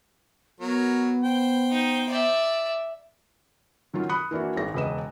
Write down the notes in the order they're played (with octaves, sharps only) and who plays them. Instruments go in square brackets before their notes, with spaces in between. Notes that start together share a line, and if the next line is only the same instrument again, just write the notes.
[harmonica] F#3 A#4 C#5 [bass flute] B3
[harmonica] C5 G5
[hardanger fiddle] D#4
D5 E5
[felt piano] D#3 F#3 C#4 F4
B5 D#6 F#6 C#7
E3 A#3 D4 E4 F#4
G#1 G#3 A#6
E1 C#3 B4 D#5 E7